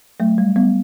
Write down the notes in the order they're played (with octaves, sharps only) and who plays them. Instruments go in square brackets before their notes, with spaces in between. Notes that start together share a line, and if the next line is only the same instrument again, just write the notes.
[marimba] F#3 A3
G3
G3 B3